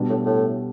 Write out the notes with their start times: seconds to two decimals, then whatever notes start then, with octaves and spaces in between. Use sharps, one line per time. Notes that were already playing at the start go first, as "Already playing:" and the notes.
Already playing: B2 G3 D4
0.09 A2
0.25 A2